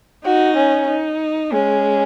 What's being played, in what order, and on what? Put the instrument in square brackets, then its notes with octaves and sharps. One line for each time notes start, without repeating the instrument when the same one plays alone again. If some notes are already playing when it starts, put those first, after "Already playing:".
[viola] D#4 [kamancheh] F#4
[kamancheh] C#4
[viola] D#4
[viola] G#3 [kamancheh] C#4